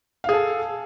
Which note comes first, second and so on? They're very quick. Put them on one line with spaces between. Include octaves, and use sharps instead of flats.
F5 G#4 A4